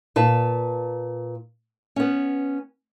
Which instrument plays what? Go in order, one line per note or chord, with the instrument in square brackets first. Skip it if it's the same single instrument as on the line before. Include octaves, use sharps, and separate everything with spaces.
[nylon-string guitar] A#2 B4 A5
B3 C#4